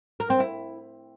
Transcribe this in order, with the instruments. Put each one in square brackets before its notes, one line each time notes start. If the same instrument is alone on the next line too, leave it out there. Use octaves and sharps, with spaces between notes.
[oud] A#4
C4
E4